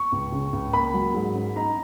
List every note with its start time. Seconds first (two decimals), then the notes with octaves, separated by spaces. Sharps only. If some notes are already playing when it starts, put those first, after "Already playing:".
Already playing: C#6
0.12 C#2
0.32 C#3
0.53 C#2
0.73 A#3 B5
0.94 F#3
1.14 G#2
1.35 C#4
1.56 D#4 A#5